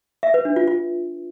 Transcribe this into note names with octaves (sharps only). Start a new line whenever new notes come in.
E5
B4
D4
F4
F4